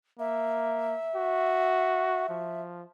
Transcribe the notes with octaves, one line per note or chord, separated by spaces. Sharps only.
A#3 E5
F#4
F3